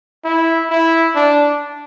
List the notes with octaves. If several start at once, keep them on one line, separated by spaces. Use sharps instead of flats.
E4
E4
D4